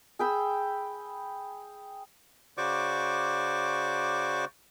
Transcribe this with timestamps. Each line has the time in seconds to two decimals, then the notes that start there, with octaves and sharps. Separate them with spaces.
0.19 G#4 G5 B5 E6
2.58 C#3 F#4 C5 D5 C#6 D6